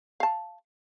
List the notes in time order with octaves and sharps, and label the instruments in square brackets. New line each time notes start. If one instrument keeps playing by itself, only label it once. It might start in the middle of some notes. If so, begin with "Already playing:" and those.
[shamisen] F5 A5